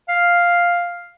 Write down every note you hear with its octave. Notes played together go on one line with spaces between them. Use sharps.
F5